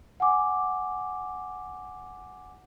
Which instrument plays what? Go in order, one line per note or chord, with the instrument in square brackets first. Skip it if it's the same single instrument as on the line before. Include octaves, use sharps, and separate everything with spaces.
[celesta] F#5 G#5 D6